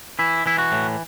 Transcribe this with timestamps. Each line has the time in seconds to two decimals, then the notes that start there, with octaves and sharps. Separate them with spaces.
0.19 E3 E4
0.46 E3 E4
0.58 F#4
0.72 A2